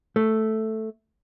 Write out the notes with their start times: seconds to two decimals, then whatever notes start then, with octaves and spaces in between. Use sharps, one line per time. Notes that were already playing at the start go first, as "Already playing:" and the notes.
0.16 A3